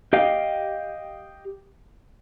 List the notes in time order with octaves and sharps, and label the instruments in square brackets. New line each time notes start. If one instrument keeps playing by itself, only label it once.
[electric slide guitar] G4 D#5 F5 G5